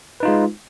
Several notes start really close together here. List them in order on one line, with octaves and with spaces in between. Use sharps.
B4 D#4 F4 G#3